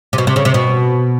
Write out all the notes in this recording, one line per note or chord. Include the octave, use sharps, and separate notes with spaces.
C3
B2
C3
C#3
C3
B2